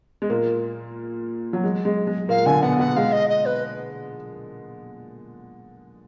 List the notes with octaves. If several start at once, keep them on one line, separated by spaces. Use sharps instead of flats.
G#3
A#2 A#3
F#3
G#3
G#3
G#3
A#2 A#3 F5
D3 D4 G#5
B2 B3 F#5
B2 B3 F#5
G#3 F5
D#5
D#5
B4